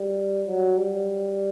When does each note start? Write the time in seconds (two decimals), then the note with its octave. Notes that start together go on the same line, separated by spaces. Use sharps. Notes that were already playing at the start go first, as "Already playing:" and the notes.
Already playing: G3
0.47 F#3
0.77 G3